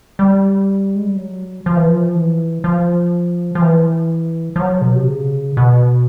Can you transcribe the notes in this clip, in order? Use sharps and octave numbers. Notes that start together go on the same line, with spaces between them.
G3
G#3
G3
F#3
F3
E3
F3
E3
F3
F3
E3
F3
F#3
B2
C3
C#3
B2